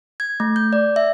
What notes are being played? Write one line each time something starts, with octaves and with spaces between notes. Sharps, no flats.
G#6
A3
G6
D5
E5